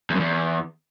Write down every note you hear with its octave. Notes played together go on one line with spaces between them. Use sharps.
E2
F#2
E2